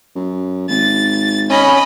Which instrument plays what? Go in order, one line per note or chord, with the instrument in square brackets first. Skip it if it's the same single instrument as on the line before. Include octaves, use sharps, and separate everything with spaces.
[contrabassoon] F#2
[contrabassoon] G#1 [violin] A6
[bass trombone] C#4 [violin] D#5 B5